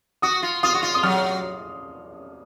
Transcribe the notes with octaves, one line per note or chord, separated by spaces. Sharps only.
F#4 D#6
F4
F4 D#6
F#4
F4
D#6
F#3 F6